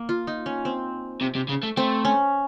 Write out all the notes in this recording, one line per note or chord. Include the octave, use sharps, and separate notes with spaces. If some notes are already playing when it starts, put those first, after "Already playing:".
Already playing: A#3
F4
D#4
C#4
C4
C3
C3
C#3
A3
A3 C4
C#4